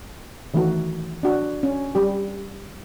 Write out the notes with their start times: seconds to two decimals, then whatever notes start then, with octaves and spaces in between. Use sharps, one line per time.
0.54 D#3 E3 A3 D#4 F#4
1.23 D4 F#4
1.63 C#4
1.95 G3 G4